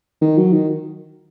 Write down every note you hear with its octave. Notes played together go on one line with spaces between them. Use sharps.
D#3
F#3
D#3